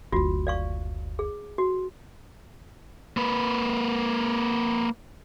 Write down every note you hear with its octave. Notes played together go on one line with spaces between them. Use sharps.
F#1 D2 F4 F#4
D5 F5 C#6
G#4
F#4
A#3 B4